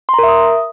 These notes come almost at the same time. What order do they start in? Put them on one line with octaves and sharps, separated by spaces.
C6 A#5 A#4 E5 D#6